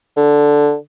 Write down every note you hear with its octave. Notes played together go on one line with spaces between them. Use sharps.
D3